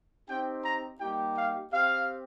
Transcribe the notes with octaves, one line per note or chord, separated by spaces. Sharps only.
C4 D#4 G4 G5
A#5
G3 A#3 D#4 G4 G5
F5
C4 G4 F5